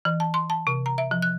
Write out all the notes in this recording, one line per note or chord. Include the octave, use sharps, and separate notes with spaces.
E3
A5
C6
A5
C3
A#5
E5
F3
F#6